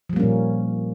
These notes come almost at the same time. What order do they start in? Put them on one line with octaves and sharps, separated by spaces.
F3 G3 A#3 C#4 A#2